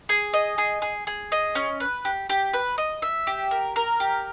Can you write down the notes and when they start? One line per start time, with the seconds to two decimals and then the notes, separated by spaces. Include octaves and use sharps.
0.09 G#4
0.34 D#5
0.58 G#4
0.82 G#4
1.07 G#4
1.32 D#5
1.55 C#4
1.80 B4
2.05 G4
2.30 G4
2.54 B4
2.78 D#5
3.02 E5
3.27 G4
3.51 A#4
3.76 A#4
4.00 G4